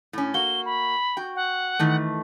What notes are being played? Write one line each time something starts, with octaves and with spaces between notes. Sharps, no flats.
A2 C#4
A#3 F#4 G7
B5
F#4 G5
F#5
D#3 E3 A3